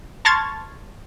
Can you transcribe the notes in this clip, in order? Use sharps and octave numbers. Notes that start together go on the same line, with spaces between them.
A5 C6 C#6 F6 G#6 A6